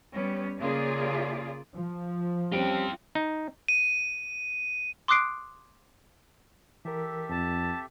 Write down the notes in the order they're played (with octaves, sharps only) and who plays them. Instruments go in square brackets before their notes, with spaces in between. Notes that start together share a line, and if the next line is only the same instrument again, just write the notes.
[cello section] G3 B3 C#4
C#3 A#3 F4 G#4 D5
[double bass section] F3
[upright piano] G3 C4 C#4 [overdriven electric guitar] F4 G5
[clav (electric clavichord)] D#4
[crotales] D#7
[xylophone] C6 D6 D#6 F#6 C7 D7
[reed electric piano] E3 A#4 [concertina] G4 A4 E5
[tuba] F2 [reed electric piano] C4 [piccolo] A5